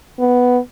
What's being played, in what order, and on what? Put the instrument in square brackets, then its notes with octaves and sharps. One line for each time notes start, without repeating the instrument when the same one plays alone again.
[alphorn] B3